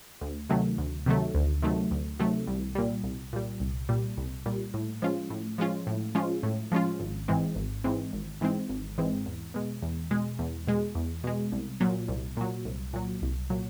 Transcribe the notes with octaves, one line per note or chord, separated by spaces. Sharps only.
D2
C3 D#3 F#3 A3
D2
C3 D#3 F#3 A3
D2
C3 D#3 F#3 A3
D2
C3 D#3 F#3 A3
C2
A#2 G3
C2
A#2 G3
C2
A#2 G3
C2
A#2 G3
A2
F3 G#3 C#4 F4
A2
F3 G#3 C#4 F4
A2
F3 G#3 C#4 F4
A2
F3 G#3 C#4 F4
G#1
G#2 E3 G#3 C4
G#1
G#2 E3 G#3 C4
G#1
G#2 E3 G#3 C4
G#1
G#2 E3 G#3 C4
E2
B2 G#3
E2
B2 G#3
E2
B2 G#3
E2
B2 G#3
C2
A#2 F#3
C2
A#2 F#3
C2
A#2 F#3
C2
A#2 F#3